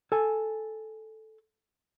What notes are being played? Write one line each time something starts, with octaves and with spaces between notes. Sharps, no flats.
A4 G#5